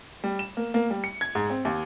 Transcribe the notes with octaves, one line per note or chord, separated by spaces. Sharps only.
G3
E7
A#3
A#3
G3
C#7
G#6
G#2
C4
D#2